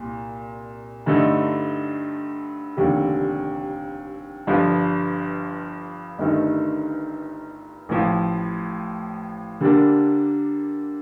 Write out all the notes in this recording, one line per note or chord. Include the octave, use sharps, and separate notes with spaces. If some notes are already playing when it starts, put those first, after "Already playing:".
Already playing: C2 A#2
G2 D3 A3 D#4
F1 D#2 D3 G3
G1 G2 F3
G1 G2 D#3 A3 D#4
A1 A2 F3
D3 G3 A#3 D4